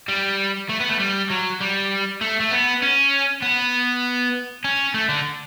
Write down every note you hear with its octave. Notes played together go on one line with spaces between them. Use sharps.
G3
A3
B3
A3
G3
F#3
G3
A3
A3
B3
C#4
B3
C#4
A3
D3